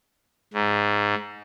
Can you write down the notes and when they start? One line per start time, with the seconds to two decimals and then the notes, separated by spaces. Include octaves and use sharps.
0.53 G#2